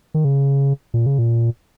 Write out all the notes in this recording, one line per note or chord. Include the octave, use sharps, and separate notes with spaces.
D#3
C#3
A#2
C#3
A#2